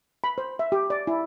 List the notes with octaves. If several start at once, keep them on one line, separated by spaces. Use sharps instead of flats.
B5
C5
E5
G4
D5
E4